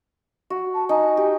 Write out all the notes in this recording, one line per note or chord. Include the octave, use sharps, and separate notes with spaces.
F#4
A5
D#4 G#5
G4